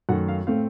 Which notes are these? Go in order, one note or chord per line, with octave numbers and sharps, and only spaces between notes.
F#2 D#3 A3 F#5
F5
A2 A3 C4 F5